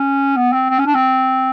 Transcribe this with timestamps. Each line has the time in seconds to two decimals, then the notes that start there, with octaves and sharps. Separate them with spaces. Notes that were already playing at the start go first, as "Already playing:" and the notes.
Already playing: C#4
0.37 B3
0.53 C4
0.70 C4
0.79 C#4
0.86 D4
0.94 C4